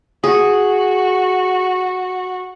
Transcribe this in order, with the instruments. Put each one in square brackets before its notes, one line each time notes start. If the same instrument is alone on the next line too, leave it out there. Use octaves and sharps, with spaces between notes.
[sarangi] F#4 [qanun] G#4